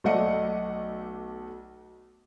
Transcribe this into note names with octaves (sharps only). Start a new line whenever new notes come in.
B1 A3 D5 D#5 F#5 C#7